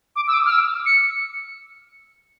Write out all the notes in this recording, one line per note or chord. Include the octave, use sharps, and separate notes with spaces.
D6
E6
D6
F6
E6
C#7